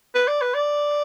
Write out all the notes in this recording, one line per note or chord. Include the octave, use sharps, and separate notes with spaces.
B4
D5
B4
D5